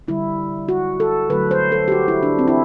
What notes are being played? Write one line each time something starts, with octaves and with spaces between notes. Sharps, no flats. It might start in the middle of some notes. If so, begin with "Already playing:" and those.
D3 G3 E4
F#4
A4
D3 F#3 A3 B4
C5
A4
G4
F#4
E4
D4
C4
E4